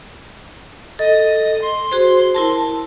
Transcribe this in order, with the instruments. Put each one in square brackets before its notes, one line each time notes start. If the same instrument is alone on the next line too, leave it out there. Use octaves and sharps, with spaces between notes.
[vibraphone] A4 [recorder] D#5
[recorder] C6
[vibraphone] F#4 G#4 C5
E4 A#4 A5